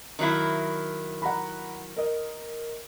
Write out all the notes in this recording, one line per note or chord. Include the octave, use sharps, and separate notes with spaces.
D#3 F#3 E4
F#5 A#5 B5
A#4 D#5